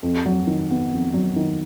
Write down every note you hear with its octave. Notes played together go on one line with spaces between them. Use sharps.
F2
F#3
D#3
B3
F2
F#3
D#3